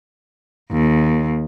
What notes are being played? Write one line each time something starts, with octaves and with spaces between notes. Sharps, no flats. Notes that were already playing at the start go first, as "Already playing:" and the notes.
D#2